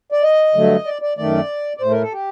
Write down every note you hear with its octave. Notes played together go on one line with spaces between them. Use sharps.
D5
D#5
G2 D3 F#3 A3
D5
D5
F#2 D#3 A3 D5
D5
A2 A3 C5
A#4
A4
G4